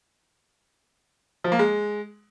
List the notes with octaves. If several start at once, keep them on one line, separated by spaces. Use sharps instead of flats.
F3
A#3
G#3